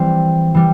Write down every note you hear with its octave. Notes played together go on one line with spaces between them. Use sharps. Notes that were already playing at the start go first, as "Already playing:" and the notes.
Already playing: E3 G3 C4
E3 G3